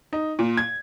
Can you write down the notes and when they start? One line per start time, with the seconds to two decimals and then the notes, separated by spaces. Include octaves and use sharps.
0.13 D#4
0.39 A#2
0.57 G#6